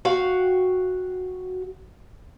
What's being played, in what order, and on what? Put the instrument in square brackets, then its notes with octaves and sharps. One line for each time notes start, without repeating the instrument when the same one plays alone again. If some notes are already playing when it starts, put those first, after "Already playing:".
[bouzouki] F#4 F5 G5